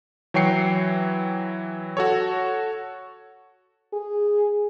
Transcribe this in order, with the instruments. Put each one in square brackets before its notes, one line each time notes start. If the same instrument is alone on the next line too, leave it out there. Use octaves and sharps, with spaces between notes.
[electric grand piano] E3 F#3 C#5 G5 C7 C#7
F#4 A4 C#5
[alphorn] G#4